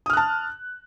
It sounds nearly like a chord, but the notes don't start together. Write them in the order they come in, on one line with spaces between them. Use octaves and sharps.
D#6 F6 F#6 A5